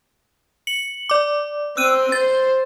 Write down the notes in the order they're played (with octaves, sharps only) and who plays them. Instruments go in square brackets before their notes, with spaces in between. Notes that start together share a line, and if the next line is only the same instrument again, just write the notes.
[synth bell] C#7 F#7
D5 D6
[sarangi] C4 [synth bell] E6 F#6 D#7
[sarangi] C5 [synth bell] A6